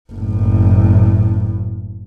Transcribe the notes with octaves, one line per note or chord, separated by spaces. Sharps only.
F#1 A2